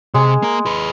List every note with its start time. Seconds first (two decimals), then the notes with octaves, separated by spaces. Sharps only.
0.14 C3 G#3
0.43 A#3 A#4
0.66 G#4 B4